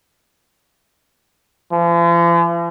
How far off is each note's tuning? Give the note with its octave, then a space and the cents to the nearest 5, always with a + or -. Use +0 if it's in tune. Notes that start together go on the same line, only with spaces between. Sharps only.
F3 -45